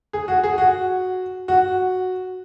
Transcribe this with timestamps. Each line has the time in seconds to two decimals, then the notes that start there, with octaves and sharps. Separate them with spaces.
0.13 G#4
0.28 F#4
0.44 G#4
0.58 F#4
1.48 F#4